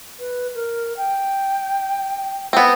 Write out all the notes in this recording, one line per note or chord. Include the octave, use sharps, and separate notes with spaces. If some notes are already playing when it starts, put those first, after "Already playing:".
B4
A#4
G5
B3 C4